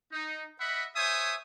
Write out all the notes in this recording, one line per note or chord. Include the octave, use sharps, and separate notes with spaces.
D#4
D#5 E5 F#5 B5
C5 C#5 E5 G#5 D#6